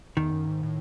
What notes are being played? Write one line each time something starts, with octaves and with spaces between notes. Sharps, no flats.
E2 D#3
F#2
G#2
A2